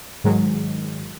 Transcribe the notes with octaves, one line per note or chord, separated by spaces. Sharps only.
G#2 D#3 F#3 G#3